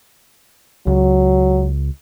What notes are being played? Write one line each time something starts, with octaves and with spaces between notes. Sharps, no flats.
C#2 F#3